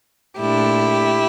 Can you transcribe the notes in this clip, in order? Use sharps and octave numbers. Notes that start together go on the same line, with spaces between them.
A#2 A3 D4 E4 G4